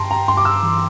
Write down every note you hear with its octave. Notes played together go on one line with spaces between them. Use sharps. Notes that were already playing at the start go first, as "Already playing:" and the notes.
Already playing: G2 G5 A5 A#5 C6
A#5
G2 C6
D6
E6
E3